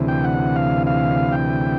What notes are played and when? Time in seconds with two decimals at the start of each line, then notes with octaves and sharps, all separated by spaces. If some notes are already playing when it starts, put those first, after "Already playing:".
Already playing: D2 C3 E3
0.08 G5
0.24 F#5
0.56 F5
0.87 F5
1.32 G5